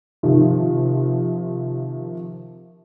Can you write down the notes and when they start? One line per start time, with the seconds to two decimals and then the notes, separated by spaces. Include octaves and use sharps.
0.23 C3 D#3 F3